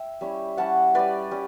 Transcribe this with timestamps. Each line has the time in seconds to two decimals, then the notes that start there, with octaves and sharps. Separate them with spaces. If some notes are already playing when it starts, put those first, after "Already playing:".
Already playing: E5 G5
0.21 G3 C#4 E4
0.57 G3 C#4 E4 F#5 A5
0.94 G3 C#4 E4 B4 D5
1.31 G3 C#4